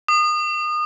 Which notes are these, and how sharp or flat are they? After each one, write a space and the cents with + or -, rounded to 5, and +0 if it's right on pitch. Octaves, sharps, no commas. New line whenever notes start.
D#6 -30